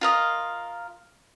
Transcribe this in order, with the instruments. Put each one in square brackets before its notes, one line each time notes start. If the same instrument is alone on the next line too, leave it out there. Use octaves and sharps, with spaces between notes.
[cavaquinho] F4 A#4 D#5 F5